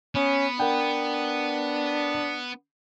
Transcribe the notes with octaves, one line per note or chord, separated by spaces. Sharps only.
B3 C#4
D4 A#4 F#5 G5